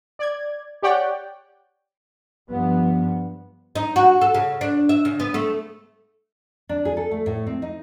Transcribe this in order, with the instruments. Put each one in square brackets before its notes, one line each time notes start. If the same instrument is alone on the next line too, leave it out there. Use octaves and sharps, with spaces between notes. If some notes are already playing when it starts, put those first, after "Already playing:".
[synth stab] D5 G#6
G4 C#5 D5 F#5 G5
[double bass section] G2 F3 B3
[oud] D#4
F#4
A4
C#3
D4
E5
C#3
B3
A3
[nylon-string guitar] D4
G#4
A4
A3
A2
C4
D#4